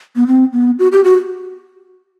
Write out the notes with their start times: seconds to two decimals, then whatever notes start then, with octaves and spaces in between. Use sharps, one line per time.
0.16 B3
0.27 C4
0.53 B3
0.79 F#4
0.92 G4
1.04 F#4